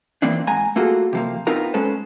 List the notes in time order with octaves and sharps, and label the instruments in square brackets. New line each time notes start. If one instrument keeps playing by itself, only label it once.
[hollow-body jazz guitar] E3 F3 A#3 C4 D4
G#2 G#5 A#5
A3 A#3 F4 F#4 G#4 A4
C3 F3 A#3
B3 C4 D#4 F4 A#4 A#5
G#3 C#4 A4 B4 C5